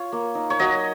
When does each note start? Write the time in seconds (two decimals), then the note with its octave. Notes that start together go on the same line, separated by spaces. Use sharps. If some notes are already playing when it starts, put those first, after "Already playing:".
Already playing: F4 C#5
0.12 A#3
0.35 D#4
0.50 C#5
0.59 F#3 D#5